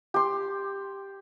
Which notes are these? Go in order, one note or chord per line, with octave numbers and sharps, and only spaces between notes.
G4 C6